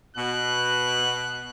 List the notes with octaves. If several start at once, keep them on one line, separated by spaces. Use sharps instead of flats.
B2 F#6